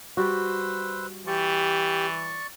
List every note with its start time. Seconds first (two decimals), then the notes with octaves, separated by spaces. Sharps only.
0.17 G3 F#4 B4 C5 E6
1.27 E3 G4 D5 C#6